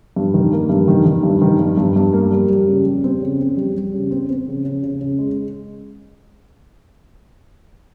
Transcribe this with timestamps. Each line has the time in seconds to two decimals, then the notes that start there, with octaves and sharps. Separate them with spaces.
0.16 G2
0.34 D#3
0.53 A#3
0.69 G2
0.88 D#3
1.06 D#3
1.23 G2
1.42 D#3
1.59 G2
1.77 G2
1.96 G2
2.13 A#3
2.31 G3
2.49 G3
2.68 C#3
2.86 G3
3.04 C4
3.21 C#3
3.40 C4
3.57 G3
3.75 G3
3.94 C#3
4.11 C4
4.29 C4
4.48 C#3
4.64 C#3
4.83 C#3
5.01 C#3
5.18 G#3